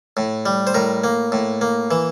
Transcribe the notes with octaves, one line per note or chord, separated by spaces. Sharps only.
A2
G3
C5
A2 A#4
A#3
A2
A#3
E3